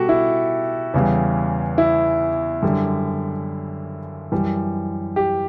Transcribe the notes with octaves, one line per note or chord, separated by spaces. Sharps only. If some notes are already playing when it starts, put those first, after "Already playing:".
Already playing: B2 G3 F#4 G4 A4
E4
E2 C#3 G3
E4
F#2 D3 G3
F#2 E3 G3
G4